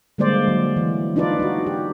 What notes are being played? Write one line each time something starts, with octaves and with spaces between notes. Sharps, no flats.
D3 G3 G#3 A#3 C5 D5
F#3
E3
D4 D#4 F4 B4 D5
D#4 F#4
G4